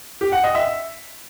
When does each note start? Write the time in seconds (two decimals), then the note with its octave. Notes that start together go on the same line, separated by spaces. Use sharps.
0.21 G4
0.32 F#5
0.43 D#5
0.55 E5